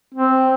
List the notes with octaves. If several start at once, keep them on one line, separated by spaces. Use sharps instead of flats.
C4